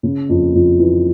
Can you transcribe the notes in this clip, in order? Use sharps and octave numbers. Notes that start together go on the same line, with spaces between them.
C#3
F2
F2
E3